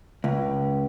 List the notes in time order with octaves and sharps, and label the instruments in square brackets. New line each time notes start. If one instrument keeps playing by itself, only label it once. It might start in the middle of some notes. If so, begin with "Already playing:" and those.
[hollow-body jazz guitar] C#2